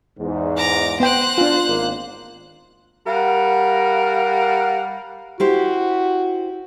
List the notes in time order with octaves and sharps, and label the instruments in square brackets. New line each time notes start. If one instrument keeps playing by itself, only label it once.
[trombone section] E2 G#2
[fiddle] A#5 D6
[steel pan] B3 G5 [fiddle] C5 F#6
[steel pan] D4 F4
[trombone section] G#1 A#3
[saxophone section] G3 A#4 F5 F#5
[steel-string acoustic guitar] E4 G4 C5 [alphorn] F#4